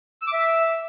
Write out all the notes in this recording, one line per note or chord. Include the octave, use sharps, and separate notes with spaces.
E6
D6
E5